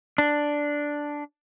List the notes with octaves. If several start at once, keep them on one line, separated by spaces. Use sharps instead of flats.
D4